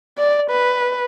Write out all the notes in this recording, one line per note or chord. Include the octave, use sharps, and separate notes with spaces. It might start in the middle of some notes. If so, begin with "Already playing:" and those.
D5
B4